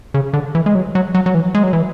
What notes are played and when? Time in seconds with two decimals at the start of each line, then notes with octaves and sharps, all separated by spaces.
0.14 C#3
0.33 D3
0.55 E3
0.66 G#3
0.75 F#3
0.95 F#3
1.15 F#3
1.26 F#3
1.34 E3
1.55 G#3
1.63 F#3
1.73 E3